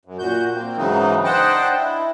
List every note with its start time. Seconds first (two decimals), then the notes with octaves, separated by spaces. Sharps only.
0.05 F#2
0.19 A#2 F#4 G6
0.54 A#3 C4
0.77 G#2 C#3 E3 F#3 D#4
1.24 D4 C5 D#5 F#5 G5 A5
1.77 E4